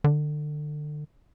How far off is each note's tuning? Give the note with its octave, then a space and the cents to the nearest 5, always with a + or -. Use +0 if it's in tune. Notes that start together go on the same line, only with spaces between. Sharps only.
D3 +30